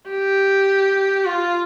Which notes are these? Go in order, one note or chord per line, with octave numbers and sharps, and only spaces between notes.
G4
F4